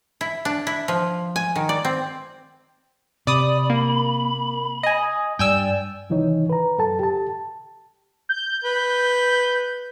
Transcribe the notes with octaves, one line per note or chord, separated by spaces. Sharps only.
E4
D4
E4
F3
G#5
D#3
D5
C4
C3 D5 B5 D#6
A#3
D#5 G#5
G2 D5 G5 G#5 E6
C2 D#3 E3 D#4 C#5
B4 A#5
F#2 A4 A5
G4 A5
G6
B4